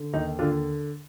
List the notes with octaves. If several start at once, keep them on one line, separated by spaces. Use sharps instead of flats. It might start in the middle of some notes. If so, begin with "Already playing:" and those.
Already playing: D3
D#2 D#4
D3 D4 F4